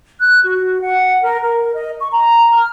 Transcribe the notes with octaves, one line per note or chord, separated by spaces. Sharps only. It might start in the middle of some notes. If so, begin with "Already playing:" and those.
F#6
F#4
F#5
A#4
A#4
D#5
C#6
A#5
F6